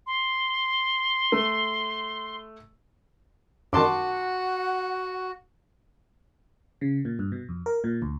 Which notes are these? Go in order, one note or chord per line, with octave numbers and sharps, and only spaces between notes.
C6
A3
F#2 D#3 F#4 F#5 A5 C6 D6
C#3
A#2
G2
B2
F2
A#4
A#2
D2